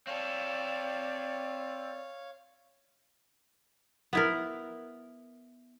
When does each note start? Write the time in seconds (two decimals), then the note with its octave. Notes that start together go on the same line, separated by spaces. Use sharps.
0.07 C4 A4 C#5 D5 F5
4.13 B3 E4 A#4